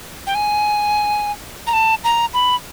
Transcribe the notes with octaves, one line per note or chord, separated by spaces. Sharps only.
G5
G#5
A#5
A5
A#5
B5